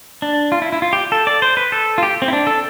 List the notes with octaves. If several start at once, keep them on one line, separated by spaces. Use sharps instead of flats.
D4
F4
E4
E4
F4
G4
A4
D5
C5
B4
A4
F4
G4
C4
E4
D4
A4